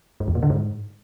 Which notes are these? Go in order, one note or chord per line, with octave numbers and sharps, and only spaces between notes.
G#2
E2
A#2
D3
G#2